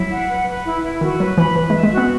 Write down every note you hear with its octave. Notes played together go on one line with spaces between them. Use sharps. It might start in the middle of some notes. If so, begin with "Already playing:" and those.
Already playing: F#3 E4
F#5
B4
B4
E4
E4
D#3 F#4
F#3 B4
E3 B5
E3 B4
G#3
E5
G#3
F#4
B3